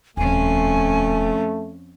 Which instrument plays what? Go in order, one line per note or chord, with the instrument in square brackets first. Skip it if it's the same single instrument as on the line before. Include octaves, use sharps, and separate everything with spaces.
[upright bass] D#1 C#3 [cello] F2 C#4 [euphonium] A3 [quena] G#5